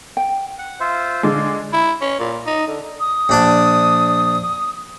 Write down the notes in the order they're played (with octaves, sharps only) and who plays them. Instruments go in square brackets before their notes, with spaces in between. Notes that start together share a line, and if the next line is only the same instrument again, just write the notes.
[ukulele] G5
[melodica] F#5
F4 C5 E5
[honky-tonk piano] D3 G#3 [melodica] D5
[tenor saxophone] E4
C#4
A#2
D#4
D3
[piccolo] D#6
[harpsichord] A#1 D4 A5